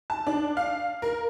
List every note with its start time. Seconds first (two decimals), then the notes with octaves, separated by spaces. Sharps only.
0.10 A5
0.27 D4
0.57 F5
1.02 A#4